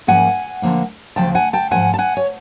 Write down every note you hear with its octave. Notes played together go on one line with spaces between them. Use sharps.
G#2 F3 A#3 C#4 F#5 G#5
D3 F3 A#3 C#4
D2 C#3 F3 G5 A5
F#5 G#5
G5 A5
G#2 F3 G#3 C#4 F#5 G#5
A5
F#5 G#5
C#5